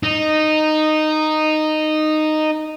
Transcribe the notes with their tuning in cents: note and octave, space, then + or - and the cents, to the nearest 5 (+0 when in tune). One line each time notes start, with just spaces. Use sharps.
D#4 -10